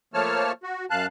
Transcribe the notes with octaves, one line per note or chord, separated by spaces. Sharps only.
F3 A3 A#3 C#5 A5 F6
F#4
F#2 F5 A5 F#6